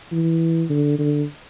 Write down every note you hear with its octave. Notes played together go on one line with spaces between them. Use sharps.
E3
D3
D3